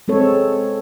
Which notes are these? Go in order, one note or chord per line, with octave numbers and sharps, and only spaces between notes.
G#3 C4 A4 C#5